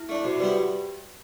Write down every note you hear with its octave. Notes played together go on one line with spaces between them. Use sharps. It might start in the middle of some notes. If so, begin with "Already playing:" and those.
Already playing: E4
A3 D4
C3 F#4
G3 B3 E4 G4 B4